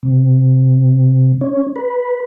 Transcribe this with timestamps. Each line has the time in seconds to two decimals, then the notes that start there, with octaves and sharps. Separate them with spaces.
0.03 C3
1.41 C#4
1.76 B4